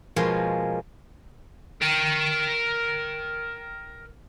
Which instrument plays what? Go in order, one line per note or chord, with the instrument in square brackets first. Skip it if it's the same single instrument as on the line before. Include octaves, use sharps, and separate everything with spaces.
[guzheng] B2 F3 G#3 A#3 C#4 C6
[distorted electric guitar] A#4 G5